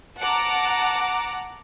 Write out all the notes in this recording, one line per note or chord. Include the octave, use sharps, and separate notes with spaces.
F#5 A5 A#5 D6